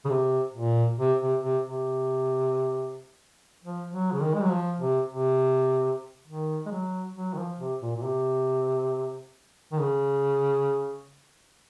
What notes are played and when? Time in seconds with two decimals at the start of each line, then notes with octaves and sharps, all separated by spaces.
0.05 C#3
0.10 C3
0.54 A#2
0.99 C3
1.21 C3
1.43 C3
1.65 C3
3.63 F3
3.92 F#3
4.12 C#3
4.22 D#3
4.34 G#3
4.43 F#3
4.51 F3
4.80 C3
5.10 C3
6.27 D#3
6.66 G#3
6.71 F#3
7.15 F#3
7.34 D#3
7.38 F3
7.59 C3
7.82 A#2
7.96 A#2
8.04 C3
9.72 D#3
9.80 C#3